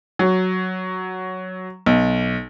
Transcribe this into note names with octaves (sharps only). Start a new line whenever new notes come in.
F#3
B1